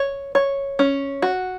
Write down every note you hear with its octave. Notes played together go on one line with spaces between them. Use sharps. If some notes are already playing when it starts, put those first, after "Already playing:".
Already playing: C#5
C#5
C#4
F#4